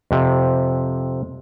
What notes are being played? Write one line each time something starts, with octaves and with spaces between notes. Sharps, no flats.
F2 C3